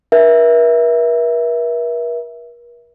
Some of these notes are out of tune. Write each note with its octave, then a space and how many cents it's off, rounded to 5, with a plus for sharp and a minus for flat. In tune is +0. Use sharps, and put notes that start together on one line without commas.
A#4 +45 E5 +0